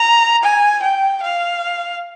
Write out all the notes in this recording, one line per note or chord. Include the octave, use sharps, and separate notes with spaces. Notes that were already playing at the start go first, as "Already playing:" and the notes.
Already playing: A#5
G#5
G5
F5